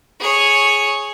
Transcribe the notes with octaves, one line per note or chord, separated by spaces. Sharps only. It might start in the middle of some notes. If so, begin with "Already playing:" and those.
G#4 C#5